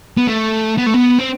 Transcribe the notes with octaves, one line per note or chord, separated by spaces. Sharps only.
B3
A3
B3
A3
B3
C4